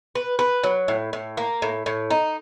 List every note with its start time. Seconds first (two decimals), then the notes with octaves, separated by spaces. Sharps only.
0.15 B4
0.39 B4
0.64 F#3
0.88 A2
1.13 A2
1.37 A#3
1.62 A2
1.86 A2
2.10 D#4